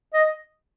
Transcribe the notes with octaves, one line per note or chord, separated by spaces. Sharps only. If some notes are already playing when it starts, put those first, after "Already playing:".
D#5